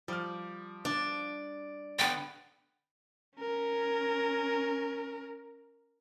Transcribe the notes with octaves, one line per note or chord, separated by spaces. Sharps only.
F3 G3 F6
D4 D5
D3 B3 G5 A6
C#4 A#4